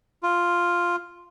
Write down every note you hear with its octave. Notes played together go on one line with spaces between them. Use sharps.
F4